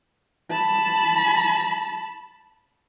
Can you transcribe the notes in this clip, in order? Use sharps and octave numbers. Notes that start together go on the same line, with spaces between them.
A5 B5